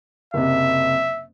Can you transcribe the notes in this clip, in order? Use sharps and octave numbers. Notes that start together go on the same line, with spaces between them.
F#1 C3 E5